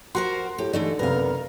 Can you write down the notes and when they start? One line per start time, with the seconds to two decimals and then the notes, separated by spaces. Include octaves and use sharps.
0.15 F#4 A#4 C5 F#5 C6
0.58 A2 G4
0.73 D3 E3 G#3 A3 D#4
0.99 F#1 C3 B3 A#4 F5